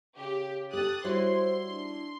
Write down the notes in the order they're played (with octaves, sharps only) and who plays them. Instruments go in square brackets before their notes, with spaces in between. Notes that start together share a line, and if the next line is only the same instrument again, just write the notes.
[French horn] C#3 [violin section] G4
[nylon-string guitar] G4 A4 G5 [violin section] D#6 F#6 A6
[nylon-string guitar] G3 [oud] E4 F#4 C#5 [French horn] C5 [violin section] C6
[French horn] D4